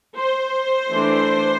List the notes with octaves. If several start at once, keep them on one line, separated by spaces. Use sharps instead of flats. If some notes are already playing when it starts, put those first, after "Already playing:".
C5
E3 A3 D4